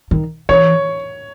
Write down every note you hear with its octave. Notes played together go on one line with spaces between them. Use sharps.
D#3
E3 C#5